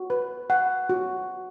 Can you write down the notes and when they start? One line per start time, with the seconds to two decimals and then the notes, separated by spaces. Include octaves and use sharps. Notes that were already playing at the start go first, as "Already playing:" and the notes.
Already playing: F#4
0.10 B4
0.50 F#5
0.89 F#4